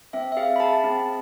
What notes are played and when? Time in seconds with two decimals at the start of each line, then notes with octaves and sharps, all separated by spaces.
0.13 C4 E5
0.32 E5
0.37 G#4 F5
0.56 B5
0.60 G#4 A5
0.84 C4